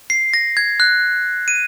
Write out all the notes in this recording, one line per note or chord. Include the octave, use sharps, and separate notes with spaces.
C7
A#6
G#6
F#6
D#7